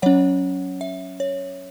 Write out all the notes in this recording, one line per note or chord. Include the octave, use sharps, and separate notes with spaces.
F#3 C#4 C#5 F#5
E5
C#5